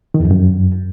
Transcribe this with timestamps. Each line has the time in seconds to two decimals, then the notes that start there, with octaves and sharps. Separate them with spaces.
0.14 D#3
0.20 E2
0.25 F2
0.31 F#2